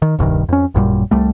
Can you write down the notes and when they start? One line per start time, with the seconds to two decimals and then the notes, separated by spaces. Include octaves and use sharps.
0.02 D#3
0.19 D#1 C2 G2 D#3
0.49 F2 C#4
0.74 A1 F#2 A#2 G3
1.11 C2 G3 A3